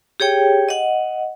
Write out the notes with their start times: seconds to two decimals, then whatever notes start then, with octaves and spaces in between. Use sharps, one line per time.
0.20 G4 G#4 C#5 G5
0.69 D#5 F#5